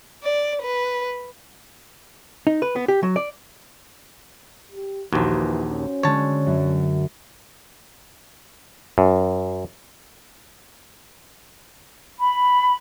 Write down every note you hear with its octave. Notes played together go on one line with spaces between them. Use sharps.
D5
B4
D#4
B4
B3
G4
F#3
D5
G4
A#1 D#2 E3 F#4 G4 C5
C#4
D3 G#3 C#5 A5
F#2
F#2
B5